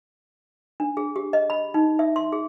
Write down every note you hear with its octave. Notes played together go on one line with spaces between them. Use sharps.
D4
G#4
G4
D#5
B5
D#4
E5
C6
G#4